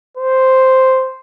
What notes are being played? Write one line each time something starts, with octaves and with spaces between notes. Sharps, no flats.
C5